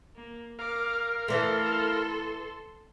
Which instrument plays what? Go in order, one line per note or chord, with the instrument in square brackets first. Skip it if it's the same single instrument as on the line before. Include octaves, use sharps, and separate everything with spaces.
[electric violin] A#3
[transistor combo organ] A#4 F5 [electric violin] D6
[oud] E3 A3 [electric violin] A4 C6